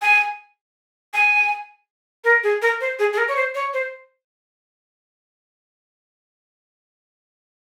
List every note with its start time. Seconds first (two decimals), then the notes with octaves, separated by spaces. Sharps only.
0.02 G#5
1.14 G#5
2.24 A#4
2.43 G#4
2.62 A#4
2.81 C5
2.99 G#4
3.13 G#4
3.18 A#4
3.28 C#5
3.36 C5
3.55 C#5
3.73 C5